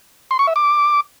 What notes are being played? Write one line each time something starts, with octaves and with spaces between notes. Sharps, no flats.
C6
C#6
E5
D6